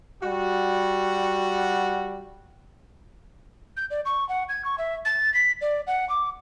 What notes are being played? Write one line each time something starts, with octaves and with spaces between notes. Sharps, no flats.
G3 F#4
G6
D5
C#6
F#5
G#6
C#6
E5
A6
B6
D5
F#5
D6